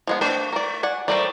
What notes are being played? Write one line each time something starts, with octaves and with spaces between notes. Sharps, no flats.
F3 G#3 B3
A3 D4 B4 C5
A#4 D5
D5 F#5 G#5
A2 G3 A3 A#4 C5 D5